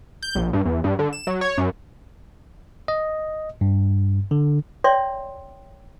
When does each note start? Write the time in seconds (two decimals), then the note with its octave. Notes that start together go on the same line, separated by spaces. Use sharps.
0.22 G6
0.35 A#1
0.53 G2
0.65 E2
0.84 G2
0.99 D3
1.13 E7
1.27 F#3
1.41 C#5
1.58 F#2
2.88 D#5
3.61 G2
4.31 D3
4.84 C#5 D5 E5 G5 C6